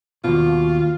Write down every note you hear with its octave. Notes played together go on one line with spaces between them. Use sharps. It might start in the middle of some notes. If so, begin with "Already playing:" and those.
D#2 B2 F4